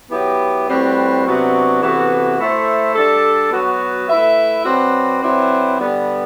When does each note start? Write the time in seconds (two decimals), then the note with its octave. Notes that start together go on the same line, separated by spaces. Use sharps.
0.11 F#3 B3 E4 G4
0.68 A2 G3 C4 F#4 B4
1.25 C3 F#3 B3 D4 F#4
1.81 C3 E3 B3 F#4 A4
2.38 A3 E4 A4 C5 E5
2.95 G3 D4 A4
3.51 F#3 B3 F#4
4.08 A3 E4 B4 E5
4.65 F#3 C4 F#4 B4 D5
5.21 F#3 C4 E4 B4 D5
5.78 D3 G3 B3